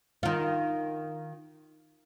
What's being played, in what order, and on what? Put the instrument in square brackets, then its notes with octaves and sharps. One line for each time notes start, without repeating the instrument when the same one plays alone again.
[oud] D#3 F4